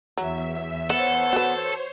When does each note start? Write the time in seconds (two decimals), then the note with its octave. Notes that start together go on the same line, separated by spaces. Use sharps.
0.17 E2 F#3 E5
0.90 B3 A4 C5 C#5 F#5
1.33 F#4 B4